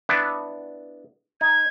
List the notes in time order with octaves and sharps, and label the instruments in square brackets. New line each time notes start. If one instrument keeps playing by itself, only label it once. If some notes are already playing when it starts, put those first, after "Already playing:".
[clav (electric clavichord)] B3 D4 E4
[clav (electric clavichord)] D#4 [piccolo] G#6